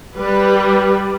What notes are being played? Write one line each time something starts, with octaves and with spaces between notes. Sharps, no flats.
G3 B4